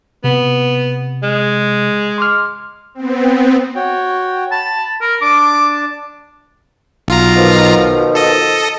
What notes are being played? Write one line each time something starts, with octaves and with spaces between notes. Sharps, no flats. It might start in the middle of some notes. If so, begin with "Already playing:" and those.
C3 B3
G#3
C6 D6 F6
B3 C4
F#4 C#5 G5
A5 B5
A#4 B5
D4 A5 D6
B1 F4 A#5
B2 D#3 F3
A4 D#5